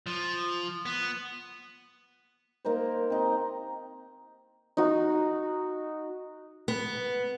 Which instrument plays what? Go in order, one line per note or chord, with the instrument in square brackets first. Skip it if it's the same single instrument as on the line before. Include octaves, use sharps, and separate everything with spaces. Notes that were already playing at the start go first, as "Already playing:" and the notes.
[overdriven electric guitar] F3
B3
[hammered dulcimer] A#3 D#4 A#4 C5
C4 D#4 G4
[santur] D#4 F#4
[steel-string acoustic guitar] B3